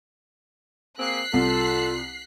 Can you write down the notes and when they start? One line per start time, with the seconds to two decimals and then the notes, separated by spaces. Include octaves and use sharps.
0.99 A#3 C4 G#4 F#6 B6 C7
1.33 C2 F4 A4